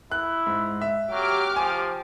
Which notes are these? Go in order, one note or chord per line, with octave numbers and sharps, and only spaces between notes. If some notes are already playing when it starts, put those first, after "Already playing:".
E4 F#6
G#2
E5
F#3 G4 D6 F6
F3 G#5